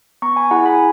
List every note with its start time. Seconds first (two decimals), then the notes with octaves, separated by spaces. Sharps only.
0.22 B3 A#5 C#6
0.36 G#5 B5
0.50 E4 G#4 F#5 A#5
0.66 G#5 B5